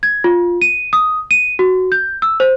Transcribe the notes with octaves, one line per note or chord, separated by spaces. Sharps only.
G#6
F4
D#7
D#6
D#7
F#4
G6
E6
C5